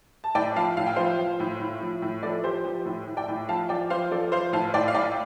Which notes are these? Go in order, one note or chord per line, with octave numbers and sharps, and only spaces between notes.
A5
A2 D5 G5
F3 F5 A5
A2 F5
G5
F3 C5 F5
F3
A2
A2
F3
A2
F3 A4 D5
F3 G4 C5
F3 G4
A2
A2
D5 G5
A2
F3 F5 A5
F3 D5 G5
F3 C5 F5
F3 A4 D5
F3 C5 F5
A2 F5 A5
A2 D5 G5
F5
A2 D5 G5